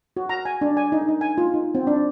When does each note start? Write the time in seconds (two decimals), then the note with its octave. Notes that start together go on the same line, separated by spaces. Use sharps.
0.17 F#4
0.29 A#5
0.45 G#5
0.61 D4
0.77 G#5
0.92 D#4
1.08 D#4
1.21 G#5
1.38 F4
1.54 D#4
1.75 C4
1.87 D4